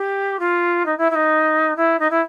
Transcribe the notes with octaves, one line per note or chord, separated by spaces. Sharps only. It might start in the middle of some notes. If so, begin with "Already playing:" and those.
Already playing: G4
F4
D#4
E4
E4
D#4
E4
D#4
E4